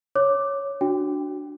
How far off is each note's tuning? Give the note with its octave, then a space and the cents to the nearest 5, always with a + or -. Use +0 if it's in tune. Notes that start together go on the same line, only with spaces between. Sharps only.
C#5 +0 D6 +0
D4 +0 F#4 +0 G5 +15